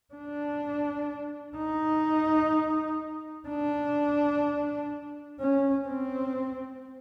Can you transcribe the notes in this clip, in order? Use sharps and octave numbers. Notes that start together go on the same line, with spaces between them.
D4
D#4
D4
C#4
C4